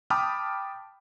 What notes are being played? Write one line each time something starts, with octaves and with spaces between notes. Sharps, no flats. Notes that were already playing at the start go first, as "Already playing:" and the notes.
G5 A5 B5 D6 D#6 F6